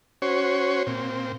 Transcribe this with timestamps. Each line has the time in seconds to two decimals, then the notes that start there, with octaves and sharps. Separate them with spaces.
0.22 C#4 F#4 C5 C#5
0.87 A#2 C4